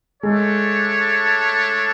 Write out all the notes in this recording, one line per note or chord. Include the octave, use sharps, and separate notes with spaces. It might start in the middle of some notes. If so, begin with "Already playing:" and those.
G#3 A3 D4 A4 C#5